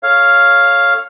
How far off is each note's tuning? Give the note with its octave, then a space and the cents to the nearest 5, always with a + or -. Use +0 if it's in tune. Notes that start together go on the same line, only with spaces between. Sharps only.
A4 +0 C#5 +0 F5 +0